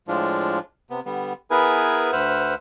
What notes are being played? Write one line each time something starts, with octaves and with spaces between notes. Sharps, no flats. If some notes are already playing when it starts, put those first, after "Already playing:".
A2 F3 G#3 D4 F4
C3 B3
D3 G3 B3
B3 E4 G#4 A#4 B4 G#5
D2 B4 C5 E5 F#5 F6